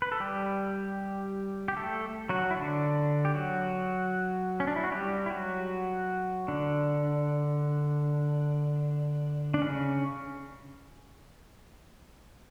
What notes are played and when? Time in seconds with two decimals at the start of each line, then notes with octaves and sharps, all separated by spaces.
0.02 B4
0.12 A4
0.20 G3 G4
1.68 G4
1.77 A3 A4
2.29 F#3 F#4
2.51 E4
2.56 D3 D4
3.25 G4
3.34 F#3 F#4
4.60 C#4
4.67 D4
4.76 E4
4.84 F#4
4.92 G3 G4
5.26 E4
5.31 F#3 F#4
6.48 D3 D4
9.54 D4
9.62 C#3 C#4